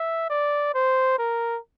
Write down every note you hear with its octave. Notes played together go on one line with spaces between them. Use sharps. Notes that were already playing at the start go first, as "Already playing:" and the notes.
Already playing: E5
D5
C5
A#4